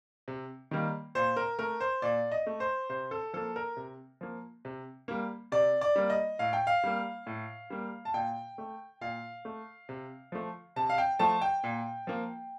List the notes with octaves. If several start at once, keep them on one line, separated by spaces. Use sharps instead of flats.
C3
D#3 G3 A#3
A#2 C5
A#4
A3 A#4
C5
A#2 D5
D#5
A3
C5
C3 C5
A4
F3 A#3 A4
A#4
C3
F3 A#3
C3
G3 A#3
C3 D5
D5
G3 A#3
D#5
A2 F5
G5
F5
G3 A#3
A2
G3 A#3
A5
A#2 G5
A3
A#2 F5
A3
C3
F3 A3
C3 A5
F5
G5
F3 A3 A5
G5
A#2
F3 A#3